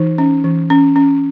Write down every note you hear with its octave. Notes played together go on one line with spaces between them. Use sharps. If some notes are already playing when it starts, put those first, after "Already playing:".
Already playing: E3 D#4
C#4
E3
C#4
C#4